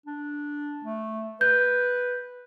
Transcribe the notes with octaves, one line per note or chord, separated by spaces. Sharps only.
D4
A3
B4 G6